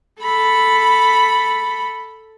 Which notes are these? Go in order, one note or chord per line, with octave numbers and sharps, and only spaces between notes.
A4 B5